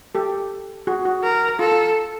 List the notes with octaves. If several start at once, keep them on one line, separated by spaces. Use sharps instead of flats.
G4 A4
F#4 G#4
F#4
A#4
F4 A4